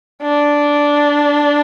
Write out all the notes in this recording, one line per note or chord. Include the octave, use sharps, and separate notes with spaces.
D4